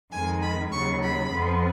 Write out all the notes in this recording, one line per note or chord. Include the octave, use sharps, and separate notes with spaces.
F2 D#3 G#3 G#5
B5
D#2 C#3 F#3 C#6
B5
F2 F3 B3